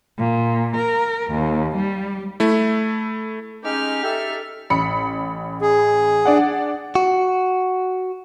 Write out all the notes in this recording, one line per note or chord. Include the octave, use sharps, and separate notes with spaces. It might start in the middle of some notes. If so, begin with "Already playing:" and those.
A#2
A#4
D#2
G3
A3 E4
G#3 C#4 D#4 G4 F6
G4 A4 E5
A1 B5 C#7
G#4
D4 D5 F#5
F#4